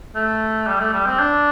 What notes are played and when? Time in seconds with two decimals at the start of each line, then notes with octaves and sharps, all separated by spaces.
0.15 A3
0.67 G3
0.80 A3
0.93 G3
1.06 C4
1.19 D4